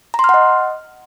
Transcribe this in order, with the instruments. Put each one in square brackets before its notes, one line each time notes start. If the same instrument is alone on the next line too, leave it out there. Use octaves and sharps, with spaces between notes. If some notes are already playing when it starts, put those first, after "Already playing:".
[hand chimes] A#5
C6
F6
F#5
D#5